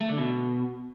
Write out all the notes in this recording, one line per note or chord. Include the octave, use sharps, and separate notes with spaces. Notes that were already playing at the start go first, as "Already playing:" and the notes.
A3
D3
B2